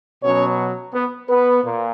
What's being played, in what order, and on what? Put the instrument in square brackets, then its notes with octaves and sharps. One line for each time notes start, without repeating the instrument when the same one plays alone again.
[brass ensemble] B2 F#3 C#4 C#5
B3 B4
B3 B4
A#2